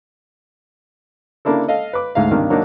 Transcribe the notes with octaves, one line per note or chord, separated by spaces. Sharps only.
C#3 A#3 D4 E4 A4
A4 D#5 F5
B4 D6
D2 G#2 E5 F5
G2 C3 D#3 A#3 D4 F6
F#3 A#3 D4 D#4